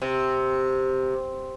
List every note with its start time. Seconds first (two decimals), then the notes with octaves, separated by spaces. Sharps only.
0.02 C3